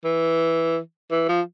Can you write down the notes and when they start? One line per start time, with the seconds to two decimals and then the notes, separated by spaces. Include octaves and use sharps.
0.04 E3
1.11 E3
1.29 F3